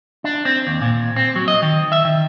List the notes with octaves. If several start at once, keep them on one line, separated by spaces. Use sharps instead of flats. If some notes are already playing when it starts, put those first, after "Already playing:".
D4
C4
D#2
A#2
C4
F#3
D#5
D#3
E5
D#3